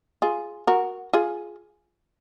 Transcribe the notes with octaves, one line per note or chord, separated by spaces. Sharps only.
F4 G#4
F#4 A#4
F4 G#4